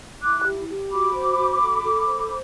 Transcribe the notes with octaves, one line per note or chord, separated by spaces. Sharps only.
E4 D6 F#6
G4
G4
F#4 B5 D6
C5
F#4
A4
A4
C5